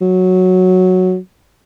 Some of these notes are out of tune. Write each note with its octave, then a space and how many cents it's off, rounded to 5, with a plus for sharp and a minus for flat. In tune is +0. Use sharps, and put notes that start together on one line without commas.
F#3 -5